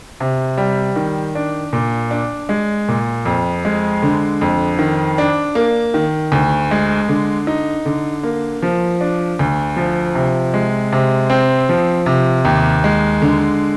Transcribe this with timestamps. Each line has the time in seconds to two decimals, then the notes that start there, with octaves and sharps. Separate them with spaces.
0.20 C3
0.58 G3
0.96 D#3
1.35 D4
1.73 A#2
2.11 D4
2.49 G#3
2.88 A#2
3.26 F2
3.65 G#3
4.02 D3
4.41 F2
4.79 D#3
5.18 D4
5.55 A#3
5.94 D#3
6.32 D2
6.71 G#3
7.08 D3
7.47 D#4
7.85 D3
8.23 A#3
8.62 F3
9.01 D4
9.39 D2
9.77 F3
10.15 C3
10.54 G#3
10.92 C3
11.30 C4
11.69 F3
12.06 C3
12.45 D#2
12.84 G#3
13.22 D3